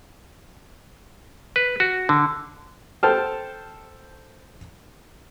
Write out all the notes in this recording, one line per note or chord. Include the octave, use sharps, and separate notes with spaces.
B4
F#4
D3
A4 C5 G5 A5 F6